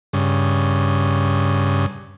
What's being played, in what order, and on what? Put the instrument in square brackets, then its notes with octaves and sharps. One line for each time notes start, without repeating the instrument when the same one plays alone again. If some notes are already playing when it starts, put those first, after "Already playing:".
[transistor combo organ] G2 C#3